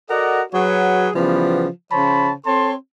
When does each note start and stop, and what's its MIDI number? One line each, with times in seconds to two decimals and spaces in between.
0.10 0.42 66
0.10 0.42 69
0.10 0.42 70
0.10 0.42 74
0.10 0.42 75
0.10 0.42 78
0.53 1.09 54
0.53 1.09 66
0.53 1.09 68
0.53 1.09 71
0.53 1.09 73
1.15 1.68 49
1.15 1.68 52
1.15 1.68 53
1.15 1.68 55
1.15 1.68 59
1.92 2.32 49
1.92 2.32 53
1.92 2.32 72
1.92 2.32 73
1.92 2.32 81
1.92 2.32 83
2.46 2.73 60
2.46 2.73 69
2.46 2.73 73
2.46 2.73 81
2.46 2.73 84